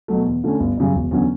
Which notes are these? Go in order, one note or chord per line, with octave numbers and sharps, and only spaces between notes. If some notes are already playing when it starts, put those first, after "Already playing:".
B2 F#3 A3
E2
D3 A3 C#4
G1
F#2 C#3 G3
E1
E2 D3 F#3 C#4